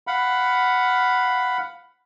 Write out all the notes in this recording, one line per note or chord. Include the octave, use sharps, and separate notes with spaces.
F5 F#5 B5